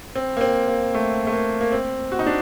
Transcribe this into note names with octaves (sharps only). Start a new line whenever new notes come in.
C4
A#3
C4
A#3
A3
A3
A#3
A#3
C4
F#4
D#4
D4